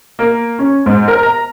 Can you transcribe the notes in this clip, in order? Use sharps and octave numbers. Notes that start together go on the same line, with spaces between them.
A#3
C#4
G#2
A#4
A#5